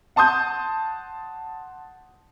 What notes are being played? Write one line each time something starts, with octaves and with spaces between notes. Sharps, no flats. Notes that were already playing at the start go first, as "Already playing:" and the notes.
F#5 A5 C6 D#6 G6